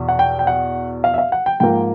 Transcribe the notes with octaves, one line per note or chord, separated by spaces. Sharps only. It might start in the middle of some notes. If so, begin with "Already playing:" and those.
Already playing: E2 B2
F#5
G5
G5
F#5
F5
E5
F5
F#5
G5
G#2 F3 A#3 G5